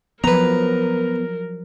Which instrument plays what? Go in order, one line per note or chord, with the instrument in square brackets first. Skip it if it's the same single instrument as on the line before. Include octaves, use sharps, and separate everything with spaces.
[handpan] F3 F#3 [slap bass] B3 [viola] A#4 [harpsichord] B4 A#5